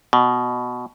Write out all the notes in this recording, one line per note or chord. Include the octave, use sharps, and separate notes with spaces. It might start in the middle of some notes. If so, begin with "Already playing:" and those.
B2